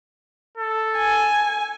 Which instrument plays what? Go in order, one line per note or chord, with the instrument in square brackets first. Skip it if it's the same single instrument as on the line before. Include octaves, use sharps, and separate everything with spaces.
[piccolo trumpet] A4
[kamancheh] G#5